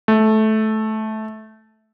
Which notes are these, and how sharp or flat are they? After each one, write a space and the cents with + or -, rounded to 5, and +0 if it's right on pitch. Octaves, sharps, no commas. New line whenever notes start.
A3 -15